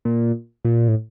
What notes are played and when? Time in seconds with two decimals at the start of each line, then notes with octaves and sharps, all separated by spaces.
0.05 A#2
0.65 A#2
0.88 A2